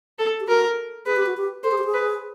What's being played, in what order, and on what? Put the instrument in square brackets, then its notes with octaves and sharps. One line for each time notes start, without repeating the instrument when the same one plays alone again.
[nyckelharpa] A4
[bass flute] G4
[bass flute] F#4 [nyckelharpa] A#4
[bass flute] G#4 [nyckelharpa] B4
[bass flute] G4
F#4
G4
[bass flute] A4 [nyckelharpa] C5
[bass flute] G#4
G4
G#4
[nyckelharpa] B4